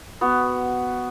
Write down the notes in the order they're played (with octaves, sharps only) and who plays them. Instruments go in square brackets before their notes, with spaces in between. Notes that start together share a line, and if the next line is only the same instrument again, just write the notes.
[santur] B3 F#4